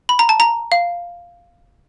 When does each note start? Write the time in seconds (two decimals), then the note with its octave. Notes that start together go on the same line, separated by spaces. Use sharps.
0.09 B5
0.19 A#5
0.29 A5
0.40 A#5
0.72 F5